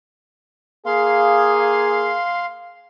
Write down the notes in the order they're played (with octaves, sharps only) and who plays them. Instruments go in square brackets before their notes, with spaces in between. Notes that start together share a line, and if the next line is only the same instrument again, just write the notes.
[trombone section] A#3 G#4 [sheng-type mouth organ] F5 C6